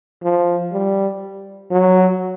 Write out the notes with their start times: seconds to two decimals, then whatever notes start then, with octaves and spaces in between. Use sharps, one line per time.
0.23 F3
0.73 G3
1.71 F#3